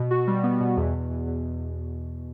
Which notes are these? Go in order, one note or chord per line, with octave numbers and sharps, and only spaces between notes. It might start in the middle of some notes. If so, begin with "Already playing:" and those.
Already playing: B2
F#4
G3
B3
B2
E2
E2
E2
E2